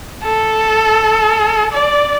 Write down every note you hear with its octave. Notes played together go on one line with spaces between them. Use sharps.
A4
D5